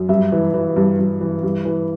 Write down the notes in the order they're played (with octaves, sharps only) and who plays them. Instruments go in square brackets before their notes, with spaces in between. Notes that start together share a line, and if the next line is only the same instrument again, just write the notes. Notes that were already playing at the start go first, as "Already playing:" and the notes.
Already playing: [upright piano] F#2
G2 E5
E3
E3
G2
G2
E3
G2
E3